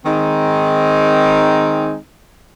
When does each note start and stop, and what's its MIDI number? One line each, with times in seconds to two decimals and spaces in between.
0.05 1.96 51
0.05 1.96 56
0.05 1.96 60
0.05 1.96 63